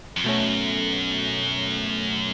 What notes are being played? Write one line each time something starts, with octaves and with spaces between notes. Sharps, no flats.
F2
F#2 B2 A3 C#4